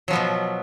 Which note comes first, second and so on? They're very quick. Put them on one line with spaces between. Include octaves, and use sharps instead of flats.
F#3 F3 B3 B2